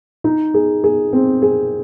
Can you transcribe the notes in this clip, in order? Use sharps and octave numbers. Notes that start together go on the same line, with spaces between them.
D#4
G#4
G#4
C4
G#4